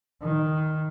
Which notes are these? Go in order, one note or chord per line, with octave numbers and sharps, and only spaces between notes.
D#3